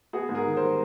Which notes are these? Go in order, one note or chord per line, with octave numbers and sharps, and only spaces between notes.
B3 F#4 G#4
G#2
G#4 A#4
D#3
G3 A#4 C5